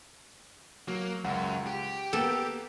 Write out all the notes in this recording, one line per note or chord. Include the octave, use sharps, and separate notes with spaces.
F#3 A#3
C#2 F#2 F#5
G4
A#3 B3 A4 G5